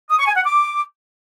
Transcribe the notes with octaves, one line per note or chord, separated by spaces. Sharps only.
D#6
C#6
G#5
F#5
D6